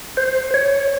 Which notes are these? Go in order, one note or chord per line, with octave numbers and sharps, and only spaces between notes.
C5
C#5